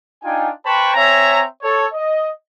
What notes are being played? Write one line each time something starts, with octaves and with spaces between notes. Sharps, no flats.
D4 D#4 F4 G5 G#5
B4 C5 G5 A5 B5 C#6
C4 C#5 E5 G#5 A#5
A4 C#5
D#5